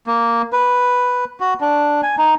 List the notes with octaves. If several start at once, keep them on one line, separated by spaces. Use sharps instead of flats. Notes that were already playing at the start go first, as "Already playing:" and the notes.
A#3
B4
F#4
D4
G#5
D#4